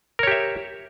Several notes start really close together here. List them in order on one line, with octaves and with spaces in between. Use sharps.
A#4 C#5 G4 E5